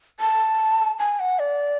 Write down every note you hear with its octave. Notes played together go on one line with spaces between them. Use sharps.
A5
G#5
F#5
D5